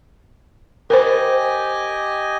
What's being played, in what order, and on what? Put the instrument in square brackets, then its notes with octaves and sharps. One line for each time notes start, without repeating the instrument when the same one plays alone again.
[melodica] G4 D#5 G#5 [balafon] A#4 C5